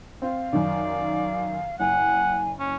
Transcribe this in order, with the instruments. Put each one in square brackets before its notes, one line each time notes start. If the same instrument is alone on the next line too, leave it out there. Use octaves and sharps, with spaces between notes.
[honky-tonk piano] C4 [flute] F5
[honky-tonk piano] F#2 D#3 [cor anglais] D5
[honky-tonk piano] F#1 [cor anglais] F#5 [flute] G#5
[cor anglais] C#4